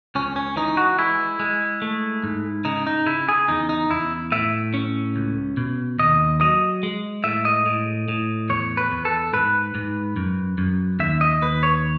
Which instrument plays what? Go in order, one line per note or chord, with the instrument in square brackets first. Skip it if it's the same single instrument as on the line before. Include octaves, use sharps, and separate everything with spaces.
[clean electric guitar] C#2 C#4
C#4
E3 D#4
F#4
G#3 E4
G#3
A3
G#2
C#3 D#4
D#4
C#3 E4
G#4
E2 D#4
D#4
E2 E4
A2 E5
C#4
C#2
B2
D#2 D#5
F#3 D#5
G#3
A2 E5
D#5
A2
A2
E2 C#5
B4
E2
A4
G#2 B4
G#2
F#2
F#2
D#2 E5
D#5
D#2 B4
C#5